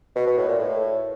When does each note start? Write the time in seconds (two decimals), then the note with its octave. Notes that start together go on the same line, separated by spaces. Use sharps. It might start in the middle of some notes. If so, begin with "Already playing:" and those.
0.16 B2
0.27 B2
0.38 A2
0.48 A#2
0.59 A2